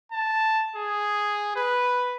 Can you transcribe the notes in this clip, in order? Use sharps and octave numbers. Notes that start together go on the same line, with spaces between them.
A5
G#4
B4